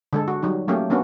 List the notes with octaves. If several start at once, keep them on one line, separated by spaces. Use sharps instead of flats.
D3 G#3 A4
F#4
F#3 G3 D#4
F#3 A3 A#3 C#4 G4
A#3 B3 C#4 D4 F#4